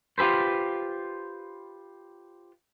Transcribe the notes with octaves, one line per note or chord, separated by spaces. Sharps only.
F4 G4 A4 B4 C5